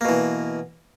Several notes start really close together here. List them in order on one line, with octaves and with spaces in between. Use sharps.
A#3 B2 E3